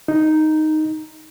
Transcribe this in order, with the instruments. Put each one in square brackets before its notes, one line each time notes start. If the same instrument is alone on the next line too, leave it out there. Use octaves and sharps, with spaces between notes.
[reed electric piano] D#4